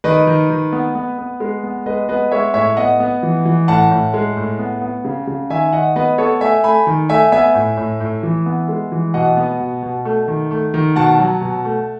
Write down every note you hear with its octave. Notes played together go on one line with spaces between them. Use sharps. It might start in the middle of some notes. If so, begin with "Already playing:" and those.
D#3 B4 D#5
D#3
D#3
B3
B3
B3
G#3
B3
G#3 B4 D#5
B3 B4 D#5
G#3 C#5 E5
A2 C#5 E5
B3 D#5 F#5
B3
E3
E3
A2 F#5 A5
A2
G#3
A2
B3
B3
C#3
C#3
D#3 E5 G#5
D#3 D#5 F#5
B3 B4 D#5
B3 A4 C#5
A3 E5 G#5
A3 G#5 B5
D#3
A3 E5 G#5
B3 E5 G#5
A2
A2
A2
E3
B3
G#3
E3
B2 D#5 F#5
B3
B2
B2
A3
D#3
A3
D#3
B2 F#5 A5
F#3
B2
A3